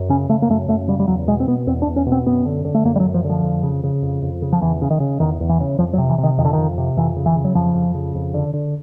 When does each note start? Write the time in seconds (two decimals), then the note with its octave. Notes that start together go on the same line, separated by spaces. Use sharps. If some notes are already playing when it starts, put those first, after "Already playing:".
Already playing: F#2
0.09 C#3 C#4
0.29 C#3 A3
0.42 A#3
0.50 F#2 A3
0.68 F#2 A3
0.88 C#3 G3
1.00 G3
1.08 E2 F#3
1.27 B2 G#3
1.40 C4
1.47 B2 B3
1.67 E2 C4
1.82 D4
1.87 E2
1.96 C#4
2.06 B2
2.12 C4
2.26 F#2 B3
2.45 D3
2.65 D3
2.75 A3
2.85 F#2 A#3
2.96 G3
3.00 F#3
3.05 F#2
3.14 F3
3.24 D3
3.30 F3
3.44 F2
3.63 C#3
3.84 C#3
4.02 F2
4.22 F2
4.42 C#3
4.53 F3
4.61 E2 E3
4.82 C#3
4.90 D#3
5.00 C#3
5.20 E2 D#3
5.40 E2
5.49 E3
5.60 C#3
5.79 F2 F3
5.93 F#3
5.98 C3
6.09 E3
6.18 C3
6.23 D#3
6.39 F2 D#3
6.45 D3
6.53 F2 D#3
6.78 C3
6.97 F2 E3
7.17 C#3
7.26 E3
7.36 C#3
7.45 F#3
7.55 F2 F3
7.75 F2
7.95 C#3
8.15 F2
8.34 D3
8.54 D3